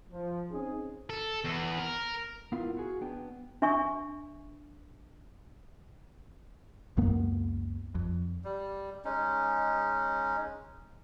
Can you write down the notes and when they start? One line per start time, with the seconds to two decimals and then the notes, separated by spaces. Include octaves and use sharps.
0.13 F3
0.52 C4 C#4 D#4 G#4
1.10 A4
1.45 E2
1.80 A#4
2.52 G2 B3 E4 F4 A#4 F5
2.77 F#4 G#4
3.01 B3 D4 G5
3.62 D4 E5 G#5 C#6
6.97 C#2 F#2 A#3 B3
7.95 F2
8.44 G3
9.05 G#3 C#4 D#4